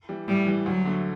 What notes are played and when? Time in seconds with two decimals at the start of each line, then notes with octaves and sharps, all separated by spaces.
0.09 E3 G3
0.28 A2 G3
0.47 E3 G3
0.66 D2 F#3
0.85 D3 A3